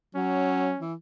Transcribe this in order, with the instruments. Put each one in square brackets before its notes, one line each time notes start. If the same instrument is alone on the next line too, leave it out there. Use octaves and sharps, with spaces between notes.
[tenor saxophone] F#3 [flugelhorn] C#4
[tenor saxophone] E3